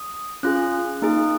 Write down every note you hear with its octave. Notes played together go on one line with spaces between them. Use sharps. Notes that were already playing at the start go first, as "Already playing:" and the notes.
Already playing: D#6
C#4 F4 G#4 F#6
A#3 D#4 G#4